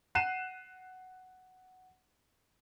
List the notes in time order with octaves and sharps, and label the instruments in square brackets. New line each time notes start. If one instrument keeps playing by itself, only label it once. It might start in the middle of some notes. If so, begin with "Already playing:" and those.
[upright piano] F#5 F#6 C7 D#7 E7